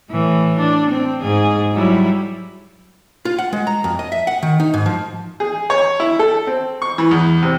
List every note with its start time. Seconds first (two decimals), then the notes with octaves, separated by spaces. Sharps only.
0.11 A2 E3
0.59 D4
0.91 C4
1.23 G#2 G#4
1.73 F#3 G3 E4
3.25 F4
3.39 F#5
3.53 G#3
3.67 A#5
3.84 F2
3.99 D#5
4.12 E5
4.27 F#5
4.43 D#3
4.60 D#4
4.74 G#2
4.86 F3
5.40 G#4
5.70 C#5
6.00 E4
6.19 A4
6.47 C4
6.82 C#6
6.98 E3
7.11 E2
7.42 C3